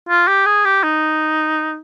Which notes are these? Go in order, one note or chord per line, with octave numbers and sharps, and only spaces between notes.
F4
G4
G#4
G4
D#4